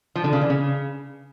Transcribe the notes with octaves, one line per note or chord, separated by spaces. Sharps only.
F3
D3
C#3
E3
C#3